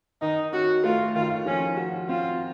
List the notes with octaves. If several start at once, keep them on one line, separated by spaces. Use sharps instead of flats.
D#3 D#4
C#4 F#4
A3 F4
D#3 F4
F3 C#4
F#4
C4 F4